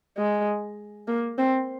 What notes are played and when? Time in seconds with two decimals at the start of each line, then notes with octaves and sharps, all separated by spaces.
0.17 G#3
1.08 A#3
1.38 C4